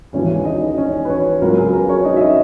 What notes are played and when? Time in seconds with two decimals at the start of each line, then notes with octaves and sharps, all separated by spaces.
0.13 E1 D#2 C#3 E3 G#3 C#4 C#5
0.45 D#4 D#5
0.78 C#4 C#5
1.05 B4
1.09 C#4 C#5
1.42 C#2 C#3 F#3 B3 A#4
1.58 G#4
1.73 A#4
1.89 C#4 C#5
2.05 D#4 D#5
2.16 E5
2.21 D#4 D#5